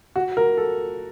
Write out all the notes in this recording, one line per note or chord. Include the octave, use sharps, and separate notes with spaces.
F#4
A#4
A4